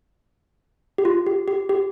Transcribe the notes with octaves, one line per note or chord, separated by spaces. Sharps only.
G4
F4
G4
G4
G4